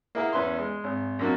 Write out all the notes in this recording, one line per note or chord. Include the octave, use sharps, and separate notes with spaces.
A#3 E4 G#4 A#4 F5 F#5
E2 C#4 B4 E5 C6
G#3
G#1
F#2 C3 A#3 D4 F#4